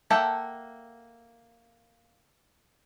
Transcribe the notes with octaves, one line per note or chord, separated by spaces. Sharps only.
A#3 A4 E5 F#5 G5